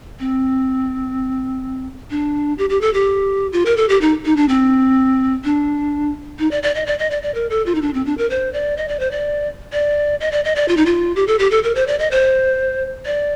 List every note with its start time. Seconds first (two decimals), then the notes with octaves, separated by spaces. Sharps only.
0.20 C4
2.11 D4
2.58 G4
2.70 G4
2.81 A4
2.94 G4
3.53 F4
3.66 A#4
3.77 A4
3.89 G4
4.01 D#4
4.25 D#4
4.37 D4
4.48 C4
5.44 D4
6.39 D#4
6.51 D5
6.63 D5
6.75 D#5
6.86 D5
6.99 D#5
7.11 D5
7.23 D5
7.35 A#4
7.50 A4
7.66 F4
7.75 D#4
7.82 D4
7.94 C4
8.06 D4
8.18 A#4
8.30 C5
8.53 D5
8.77 D#5
8.88 D5
9.00 C5
9.11 D5
9.73 D5
10.20 D#5
10.32 D5
10.44 D#5
10.55 D5
10.68 F4
10.77 D#4
10.86 F4
11.16 G4
11.27 A4
11.39 G4
11.51 A4
11.63 A#4
11.75 C5
11.87 D5
11.99 D#5
12.11 C5
13.06 D5